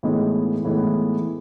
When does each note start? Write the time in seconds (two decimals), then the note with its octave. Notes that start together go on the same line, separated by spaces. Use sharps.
0.03 A2 E3 G#3 B3 D#4
0.65 A2 E3 G#3 B3 D#4